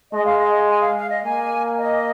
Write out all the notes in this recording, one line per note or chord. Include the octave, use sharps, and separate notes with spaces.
G#3 D#5
F5
D#5
G#5
F5
F5
D#5
A#3 G#5
D#5